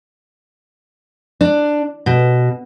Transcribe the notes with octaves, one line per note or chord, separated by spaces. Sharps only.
D4
B2